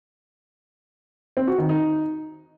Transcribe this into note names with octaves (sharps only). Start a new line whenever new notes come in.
C4
F#4
D#3
D#4